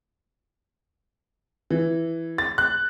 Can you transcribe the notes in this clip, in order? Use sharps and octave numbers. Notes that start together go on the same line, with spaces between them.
E3
A6
F#6